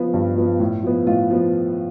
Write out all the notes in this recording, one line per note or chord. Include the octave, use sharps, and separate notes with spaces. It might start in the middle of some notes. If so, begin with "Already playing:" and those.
Already playing: F3 B3
G2
F3 B3
A2
F3 B3
A2 F4
F3 B3